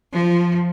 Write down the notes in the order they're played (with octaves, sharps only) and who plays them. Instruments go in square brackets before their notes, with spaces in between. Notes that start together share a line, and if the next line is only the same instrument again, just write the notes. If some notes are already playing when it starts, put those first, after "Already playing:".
[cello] F3